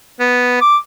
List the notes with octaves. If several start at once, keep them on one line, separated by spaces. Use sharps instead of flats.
B3
D6